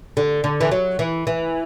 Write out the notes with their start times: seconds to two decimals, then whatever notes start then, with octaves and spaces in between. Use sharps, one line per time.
0.17 D3
0.44 D3
0.61 E3
0.71 F#3
0.99 E3
1.27 E3